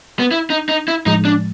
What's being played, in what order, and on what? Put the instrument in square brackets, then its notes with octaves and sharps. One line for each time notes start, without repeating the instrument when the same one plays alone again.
[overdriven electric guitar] B3
E4
D#4
D#4
E4
[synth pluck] A2 F3 G#3 [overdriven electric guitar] D#4
[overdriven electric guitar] D4